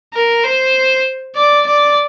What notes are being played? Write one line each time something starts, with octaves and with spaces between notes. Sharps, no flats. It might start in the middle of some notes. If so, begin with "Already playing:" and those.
A#4
C5
D5
D5